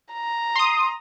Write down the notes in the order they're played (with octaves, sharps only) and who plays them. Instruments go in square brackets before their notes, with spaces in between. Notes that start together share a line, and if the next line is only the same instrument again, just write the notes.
[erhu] A#5
[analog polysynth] C6 D#6